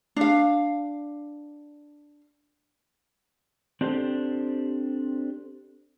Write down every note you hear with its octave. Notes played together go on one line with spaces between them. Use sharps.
D4 F5
C4 D4 G4 A4 C5